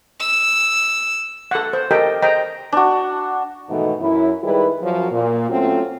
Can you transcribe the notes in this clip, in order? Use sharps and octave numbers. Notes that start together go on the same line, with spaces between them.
E6
A4 F#5
C5
G4 A4 A#4 D#5 G5
C5 D#5 G5 A#5
D4 F#4
G#2 B2 D#3 E3 A3
F#2 E4
D#3 G3 G#3 E4 G#4 B4
F#2 F3 F#3
A#2
F#3 A3 C4 C#4 F4